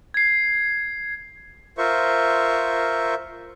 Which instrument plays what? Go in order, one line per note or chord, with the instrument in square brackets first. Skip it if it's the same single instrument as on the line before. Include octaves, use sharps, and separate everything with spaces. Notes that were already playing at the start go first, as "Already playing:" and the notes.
[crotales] G#6 C7
[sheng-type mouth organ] F4 A#4 C5 E5 C#6